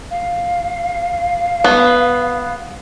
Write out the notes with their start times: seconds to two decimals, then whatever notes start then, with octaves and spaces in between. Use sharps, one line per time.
0.11 F5
1.64 B3